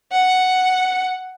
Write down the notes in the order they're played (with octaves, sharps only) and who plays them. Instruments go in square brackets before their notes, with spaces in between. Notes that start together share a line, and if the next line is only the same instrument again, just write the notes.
[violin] F#5